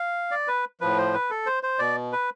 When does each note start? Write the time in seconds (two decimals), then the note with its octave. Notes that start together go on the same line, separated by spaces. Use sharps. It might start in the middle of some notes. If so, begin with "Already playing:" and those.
Already playing: F5
0.31 D5
0.48 B4
0.81 A2 F3 B4
0.98 C5
1.14 B4
1.30 A4
1.46 C5
1.63 C5
1.79 B2 D5
2.13 B4